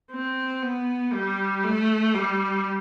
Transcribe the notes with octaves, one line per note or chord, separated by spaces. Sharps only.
C4
B3
G3
A3
G3